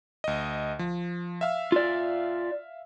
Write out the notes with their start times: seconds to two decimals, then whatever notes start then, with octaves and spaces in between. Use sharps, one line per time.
0.24 D2 D#5
0.79 F3
1.41 E5 F5 E6
1.72 F4 D5